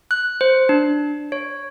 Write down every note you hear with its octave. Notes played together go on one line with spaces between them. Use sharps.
F#6
C5
D4
C#5